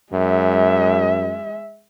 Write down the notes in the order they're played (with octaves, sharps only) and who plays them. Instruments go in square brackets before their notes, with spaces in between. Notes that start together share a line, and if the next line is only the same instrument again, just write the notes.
[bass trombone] F#2 [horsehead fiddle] G#3 E5